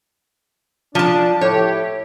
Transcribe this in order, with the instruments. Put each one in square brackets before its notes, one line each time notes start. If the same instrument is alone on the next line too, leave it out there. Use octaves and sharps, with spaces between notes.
[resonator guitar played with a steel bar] F3 A5 [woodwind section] D4
[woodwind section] A2 G4 [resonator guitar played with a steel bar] C#5